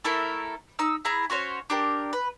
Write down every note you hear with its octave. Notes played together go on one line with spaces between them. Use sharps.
A3 E4 A4 A#4
D#4 E6
E4 G#4 A#5
C#4 F#4 C5 C#5
D4 G4 A#4
B4